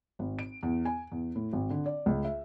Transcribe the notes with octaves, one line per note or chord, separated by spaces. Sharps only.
G#1
D7
E2
G#5
E2
A2
G#1
D3
D5
C#2
E5